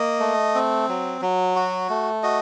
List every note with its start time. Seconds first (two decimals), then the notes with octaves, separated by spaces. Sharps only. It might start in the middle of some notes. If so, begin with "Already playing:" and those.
Already playing: A#3 D#5
0.20 A3
0.55 C4
0.88 F#3
1.21 F#3
1.56 F#4
1.89 A3
2.23 F#4 D#5